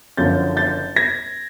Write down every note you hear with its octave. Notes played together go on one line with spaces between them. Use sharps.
F#1 F#2 D3 F3 G6 A6
G6 A6
G#6 A#6